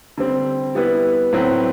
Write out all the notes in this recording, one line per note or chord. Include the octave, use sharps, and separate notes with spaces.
D3 G3 C4
G3 B3 E4 B4
A2 F#3 C4 F#4 B4